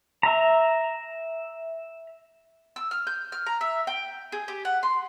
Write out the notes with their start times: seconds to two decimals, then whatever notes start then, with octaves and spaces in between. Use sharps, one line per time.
0.23 E5 A#5
2.76 E6
2.91 F6
3.07 G6
3.32 F6
3.46 A#5
3.61 E5
3.87 G5
4.32 G#4
4.48 G4
4.65 F#5
4.83 C6